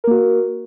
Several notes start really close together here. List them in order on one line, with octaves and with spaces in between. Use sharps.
A#4 A#3 F#4